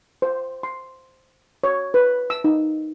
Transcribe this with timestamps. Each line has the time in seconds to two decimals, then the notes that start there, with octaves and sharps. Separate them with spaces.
0.22 C5
0.63 C6
1.64 C#5
1.94 B4
2.30 E6
2.44 D#4